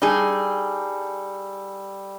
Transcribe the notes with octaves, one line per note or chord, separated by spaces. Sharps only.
G3 D#4 G#4 A4